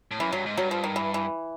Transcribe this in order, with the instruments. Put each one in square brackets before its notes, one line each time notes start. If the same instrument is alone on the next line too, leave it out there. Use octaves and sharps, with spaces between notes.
[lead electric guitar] A2
[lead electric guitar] F#2 [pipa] E3
[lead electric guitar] G2 [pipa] F#3
[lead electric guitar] G#2
[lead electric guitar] G2 [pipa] F#3
[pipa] F3
D#3
E3
E3